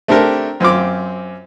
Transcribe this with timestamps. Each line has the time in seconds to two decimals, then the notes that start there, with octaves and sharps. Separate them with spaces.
0.08 A3 C4 D4 G4 A#4
0.60 F#2 C4 F4 D6